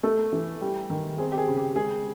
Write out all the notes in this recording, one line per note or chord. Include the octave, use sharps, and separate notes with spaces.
A3 A4
E3
G3
D#3
C4 G#4
G4
G#4
C#3
G4
G#3 G#4